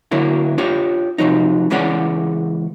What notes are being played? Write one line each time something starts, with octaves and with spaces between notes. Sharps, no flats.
D3 F#3 A#3 E4
D4 F4 G4 C#5
C3 F3 F#3 D#4
C#2 E3 G#3 C#4 D5 F#5